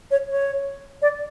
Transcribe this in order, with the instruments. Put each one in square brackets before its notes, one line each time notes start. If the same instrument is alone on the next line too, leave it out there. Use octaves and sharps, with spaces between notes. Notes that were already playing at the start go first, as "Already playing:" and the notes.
[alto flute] C#5
C#5
D5